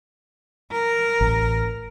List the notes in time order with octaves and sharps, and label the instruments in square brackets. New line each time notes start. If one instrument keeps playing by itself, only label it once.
[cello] A#4
[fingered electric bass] A1